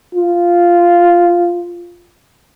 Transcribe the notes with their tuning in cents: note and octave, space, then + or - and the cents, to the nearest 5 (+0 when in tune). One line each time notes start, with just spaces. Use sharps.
F4 -5